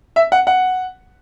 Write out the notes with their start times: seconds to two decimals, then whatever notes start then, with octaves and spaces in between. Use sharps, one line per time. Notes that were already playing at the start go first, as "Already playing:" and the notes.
0.16 E5
0.32 F#5
0.47 F#5